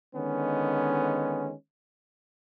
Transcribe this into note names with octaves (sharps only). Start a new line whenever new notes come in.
D3 D#3 G#3 B3 C#4